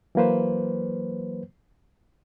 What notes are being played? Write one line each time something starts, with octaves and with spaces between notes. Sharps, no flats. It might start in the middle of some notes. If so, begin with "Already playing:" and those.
E3 F#3 A#3 B4 C5